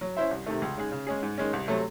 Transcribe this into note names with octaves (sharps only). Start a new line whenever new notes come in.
F#3
C#4 E4 C5 E5
C2
C3 D#3 A3
C#2
C#3 G#3 D#4 G#4
C#3
G#3 C#4 G#4
G#2
D#3 G#3 C#4
C2
C3 F#3 A3